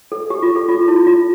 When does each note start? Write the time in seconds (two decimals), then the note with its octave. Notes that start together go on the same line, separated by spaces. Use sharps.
0.12 A4
0.30 G4
0.43 F4
0.56 A4
0.69 F4
0.88 E4
1.07 F4